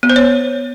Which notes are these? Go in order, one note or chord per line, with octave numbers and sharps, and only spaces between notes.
B3
C5
C#5